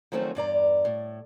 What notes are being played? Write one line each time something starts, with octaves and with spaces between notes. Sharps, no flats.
D#3 F3 F#3 A3 C4 C#4
E2 G2 D5 A#5
A2